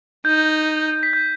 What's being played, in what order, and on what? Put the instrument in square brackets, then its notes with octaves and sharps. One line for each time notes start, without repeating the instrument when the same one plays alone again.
[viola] D#4 [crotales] G6
[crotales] B6
G6